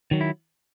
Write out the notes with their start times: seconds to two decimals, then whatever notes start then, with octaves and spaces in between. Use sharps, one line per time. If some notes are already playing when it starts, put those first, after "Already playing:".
0.11 D#3 F#3
0.21 E4